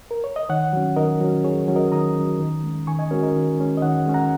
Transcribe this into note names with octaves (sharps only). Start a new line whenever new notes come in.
A#4
C#5
D#5
D#3 C#5 F#5
F#3 C#4
D#3 A#4 D#5
F#3 C#4
D#3 G#4 C#5
F#3 C#4
A#4 D#5
D#3 A#5 D#6
F#3 C#4
D#3
G#3 C#4
D#3 G#5 C#6
D#5 G#5
G#3 C#4 F#4 A#4
A#4 D#5
D#3
G#3 C#4
D#5
D#3 C#5 F#5
G#3 C#4
F#5 A#5